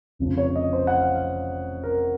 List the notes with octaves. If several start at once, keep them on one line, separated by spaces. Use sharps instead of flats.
F1 F2 C#3 F3
C#5
D#5
C5
F#5
F5
F5
A#4